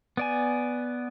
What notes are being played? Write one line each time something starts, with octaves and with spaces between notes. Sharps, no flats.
B3 D5 G#5